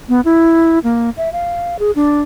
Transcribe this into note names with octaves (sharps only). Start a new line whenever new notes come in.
B3
E4
A#3
E5
F5
G#4
D4